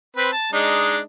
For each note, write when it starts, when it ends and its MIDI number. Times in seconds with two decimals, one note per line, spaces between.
0.16 0.30 60
0.16 0.30 71
0.33 0.50 81
0.53 0.99 56
0.53 0.99 62
0.53 0.99 63